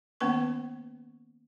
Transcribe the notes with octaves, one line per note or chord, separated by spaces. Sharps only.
D#3 A#3 B3 C#4 B4 C#6